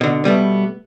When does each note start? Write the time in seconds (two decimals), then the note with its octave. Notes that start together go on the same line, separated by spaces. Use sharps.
0.01 B2 D3
0.24 B2 G3 A3 B3